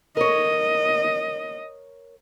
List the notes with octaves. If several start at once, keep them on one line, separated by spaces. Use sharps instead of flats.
A#4 C#5 D#5